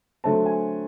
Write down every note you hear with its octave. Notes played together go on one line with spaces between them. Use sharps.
D3 F#3 A3 C4 A5
G#5